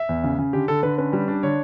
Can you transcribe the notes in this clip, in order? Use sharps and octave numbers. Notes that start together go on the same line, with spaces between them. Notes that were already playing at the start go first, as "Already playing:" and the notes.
Already playing: E5
E2
C#3
C#3
D3 G4
D3 A4
D3 B4
C#4 B4
G3
D4
D3 C#5